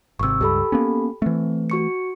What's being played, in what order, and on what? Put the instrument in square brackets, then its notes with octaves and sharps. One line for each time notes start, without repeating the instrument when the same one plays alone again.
[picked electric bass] G#1 C3 [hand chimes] C#6 E6
[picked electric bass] C#2 G2 [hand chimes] G4 A4 B5
[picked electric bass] A#3 B3 C#4
[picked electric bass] E3 A3 [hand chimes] C4
[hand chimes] F#4 C#6 C#7